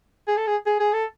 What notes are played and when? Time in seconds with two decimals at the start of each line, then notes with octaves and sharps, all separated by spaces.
0.28 G#4
0.37 A4
0.47 G#4
0.66 G#4
0.80 G#4
0.93 A4